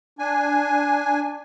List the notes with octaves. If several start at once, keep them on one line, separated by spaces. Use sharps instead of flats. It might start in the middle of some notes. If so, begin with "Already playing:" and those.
D4 G#5